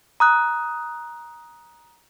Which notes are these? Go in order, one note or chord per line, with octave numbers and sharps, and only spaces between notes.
A#5 D#6 F#6